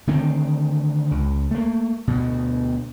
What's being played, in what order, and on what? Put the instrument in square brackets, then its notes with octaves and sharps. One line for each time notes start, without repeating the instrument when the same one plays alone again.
[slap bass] D3 D#3 A3 C4
C#2
A3 A#3
D2 B2